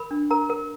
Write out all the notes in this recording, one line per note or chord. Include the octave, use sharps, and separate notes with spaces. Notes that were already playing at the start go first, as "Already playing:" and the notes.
Already playing: A#4 B5
D4
A#4 A#5
A#4